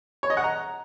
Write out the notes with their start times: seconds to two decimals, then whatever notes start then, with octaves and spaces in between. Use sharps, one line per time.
0.23 C#5
0.30 D#5
0.37 F#5
0.44 A#5